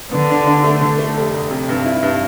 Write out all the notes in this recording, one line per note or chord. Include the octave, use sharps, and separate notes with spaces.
D3 B3
D4
D4
A3
D3
A3
F1
F1
C3
G2
E4
G2